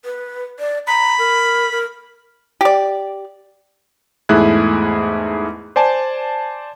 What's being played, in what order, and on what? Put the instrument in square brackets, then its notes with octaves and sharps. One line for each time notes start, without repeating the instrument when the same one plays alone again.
[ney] B4
D5
[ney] A#5 [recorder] B5
[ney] A#4
A#4
[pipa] G4 D5
[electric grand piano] E2 G#2 A3 E4 G#4 F#6
C5 D5 G#5 A5